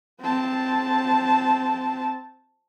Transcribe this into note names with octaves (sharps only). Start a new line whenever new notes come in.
C4 A5